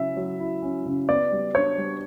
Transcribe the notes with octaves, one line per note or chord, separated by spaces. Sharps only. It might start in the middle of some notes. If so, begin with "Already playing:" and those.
Already playing: C#3 F#3 C#4 E4 E5
F#3
E4
C#4
C#3
B3 D5
G3
D4 C#5
G3